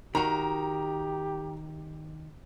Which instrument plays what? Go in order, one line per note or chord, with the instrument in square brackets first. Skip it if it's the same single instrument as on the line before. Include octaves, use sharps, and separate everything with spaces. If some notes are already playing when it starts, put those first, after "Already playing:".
[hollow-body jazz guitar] D#3 F#4 [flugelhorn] G4 [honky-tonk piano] A#5